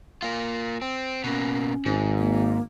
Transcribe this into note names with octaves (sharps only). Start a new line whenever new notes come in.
A#3 F4
C4
B2 A#3 C#4
G#1 G#2
A#3